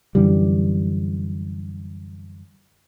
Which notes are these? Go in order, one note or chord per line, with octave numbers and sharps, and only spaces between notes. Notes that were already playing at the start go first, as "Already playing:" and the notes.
F#2 D3 E3 G3